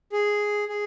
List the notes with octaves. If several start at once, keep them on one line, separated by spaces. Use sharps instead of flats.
G#4
G#4